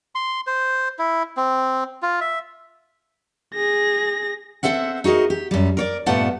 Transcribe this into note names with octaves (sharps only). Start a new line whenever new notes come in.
C6
C5
E4
C4
F4
E5
G#4 A#6
C4 A4 C5 E5 F#5
D#4 F#4 G#4 A#4 D#5
G4
F#2 G3
A#4 C#5 D5
G2 A#2 A3 B3 F#5 A5